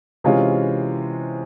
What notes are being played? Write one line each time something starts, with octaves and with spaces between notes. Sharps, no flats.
C3 E3 G#3 C#4 F4